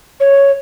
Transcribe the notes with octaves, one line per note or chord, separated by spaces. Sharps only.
C#5